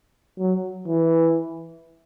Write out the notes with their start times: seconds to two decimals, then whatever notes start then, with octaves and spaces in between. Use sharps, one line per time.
0.39 F#3
0.87 E3